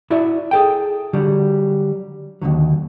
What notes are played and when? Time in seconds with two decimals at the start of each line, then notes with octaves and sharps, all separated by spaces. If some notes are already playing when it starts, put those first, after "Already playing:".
0.10 E4 F#4 D5 E5
0.51 G#4 A4 G5
1.13 D3 F#3 G3
2.42 D#2 G#2 D3 F#3